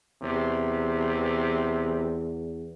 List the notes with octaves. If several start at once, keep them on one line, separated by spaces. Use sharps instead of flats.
E2 C3